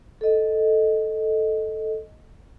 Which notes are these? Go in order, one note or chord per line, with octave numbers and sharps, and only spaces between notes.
A4 D#5